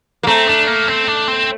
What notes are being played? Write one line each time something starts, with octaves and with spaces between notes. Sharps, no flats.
A#3
A3 C4
D4
A#3
C4
D4
C4